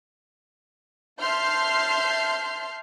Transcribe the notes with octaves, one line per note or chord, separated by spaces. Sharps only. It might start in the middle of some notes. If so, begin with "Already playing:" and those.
E5 A5 C6 F6 G6 C7